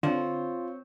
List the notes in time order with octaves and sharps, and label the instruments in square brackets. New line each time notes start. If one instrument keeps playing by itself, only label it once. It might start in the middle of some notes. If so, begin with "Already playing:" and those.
[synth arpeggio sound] D3 [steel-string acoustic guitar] C4 C5 C#5 [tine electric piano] F4